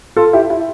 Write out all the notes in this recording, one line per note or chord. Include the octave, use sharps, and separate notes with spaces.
F4 A4
E4 G4
E4